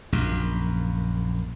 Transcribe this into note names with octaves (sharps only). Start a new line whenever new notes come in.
A#1 F#2